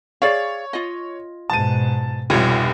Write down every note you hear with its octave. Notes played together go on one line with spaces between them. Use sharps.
G#4 C#5 D5 F5
F4 D#5
G#2 B2 A5 D#7
F1 C2 B2 G3 F4 C#5